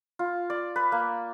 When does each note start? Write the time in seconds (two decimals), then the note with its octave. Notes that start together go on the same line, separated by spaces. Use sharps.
0.19 F4
0.50 D5
0.76 B4
0.92 A#3